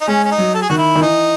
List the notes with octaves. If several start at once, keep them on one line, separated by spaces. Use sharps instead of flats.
D#4
G#3 C#4
C#4
D#4
F#3
A4
G#4
D#3 F#4
E4
D#3
E3 D#4